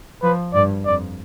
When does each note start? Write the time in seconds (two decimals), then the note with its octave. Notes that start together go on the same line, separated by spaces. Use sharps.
0.23 F3 B4
0.54 G2 D5
0.86 F2 D5